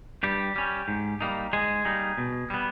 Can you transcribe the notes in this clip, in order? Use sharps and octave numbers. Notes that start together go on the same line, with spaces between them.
G2 G3 G4
G3 C#4
G#2
G3 A#3 D#4
G#2 G#3 G#4
G3 A#3 D#4
B2
G3 B3